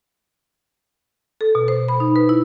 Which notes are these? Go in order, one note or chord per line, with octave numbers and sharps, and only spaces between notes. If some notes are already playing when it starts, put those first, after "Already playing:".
A4
B2
C5
B5
D#4
B4
E4